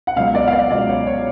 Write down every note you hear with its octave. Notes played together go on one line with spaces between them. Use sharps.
F#5
C#2 B2 F#3 F5
D5
F5
D5
C#2 B2 F#3 D5
C#5
C#5